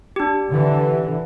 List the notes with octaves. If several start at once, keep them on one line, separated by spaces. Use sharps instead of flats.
D4 G4
D3 E3